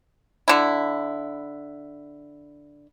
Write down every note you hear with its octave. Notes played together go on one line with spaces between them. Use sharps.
D3 E4